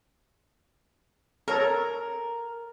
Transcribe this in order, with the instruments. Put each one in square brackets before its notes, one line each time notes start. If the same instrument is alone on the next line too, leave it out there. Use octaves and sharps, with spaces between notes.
[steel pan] A4 C#5 A#5 [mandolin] A#4